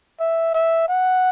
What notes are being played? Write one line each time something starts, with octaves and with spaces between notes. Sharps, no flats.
E5
E5
F#5